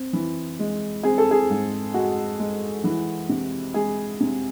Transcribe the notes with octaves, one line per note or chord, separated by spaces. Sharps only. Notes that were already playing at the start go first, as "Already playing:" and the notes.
Already playing: C4
E3
G#3
C4 G#4
A4
G#4
G#2
G#3 F#4
G#3
E3
C3
G#3 G#4
C3